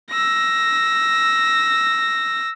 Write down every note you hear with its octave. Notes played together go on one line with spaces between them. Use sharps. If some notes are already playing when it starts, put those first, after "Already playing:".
E6 A#6